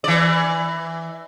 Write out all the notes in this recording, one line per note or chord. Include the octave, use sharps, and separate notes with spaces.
E3 D5